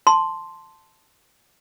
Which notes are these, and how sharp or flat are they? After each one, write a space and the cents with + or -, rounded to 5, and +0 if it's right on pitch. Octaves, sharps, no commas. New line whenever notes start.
A5 +0 C6 +0